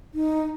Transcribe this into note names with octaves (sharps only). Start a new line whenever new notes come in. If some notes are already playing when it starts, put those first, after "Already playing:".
D#4